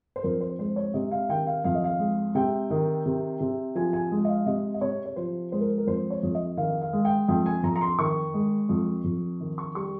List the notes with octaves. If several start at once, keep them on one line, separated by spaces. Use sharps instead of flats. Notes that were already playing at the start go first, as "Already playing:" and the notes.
C5
F2 A#4
C5
G#3 C5
C#5
C3 D#5
F5
D#3 G5
F5
F2 F5
D#5
F5
G#3
C3 G5
D#3
C3
C3
F3 G#5
G#5
G#3
D#5
F5
C3 D#5
D#5
C3 C#5
C#5
F3 C5
G#3 C5
A#4
A#4
F2 C5
C#5
F2
D#5
D#3 F5
F5
G#3
G5
F2 G5
G#5
F2 A#5
A#5
C6
D#3 C#6
G#3
F2
F2
D#3
C#6
G3 C#6